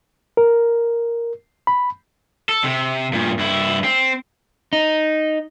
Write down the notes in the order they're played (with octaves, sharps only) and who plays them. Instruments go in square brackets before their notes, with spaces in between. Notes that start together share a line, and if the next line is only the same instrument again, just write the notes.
[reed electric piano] A#4
B5
[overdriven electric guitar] A4
C3
G2 A#2
G2 E4
C4
[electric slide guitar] D#4